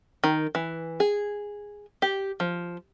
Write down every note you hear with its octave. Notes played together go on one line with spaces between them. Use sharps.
D#3
E3
G#4
G4
F3